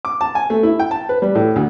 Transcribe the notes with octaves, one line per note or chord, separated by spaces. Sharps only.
D6
A5
G#5
A3
E4
G5
A5
B4
G3
A2
D2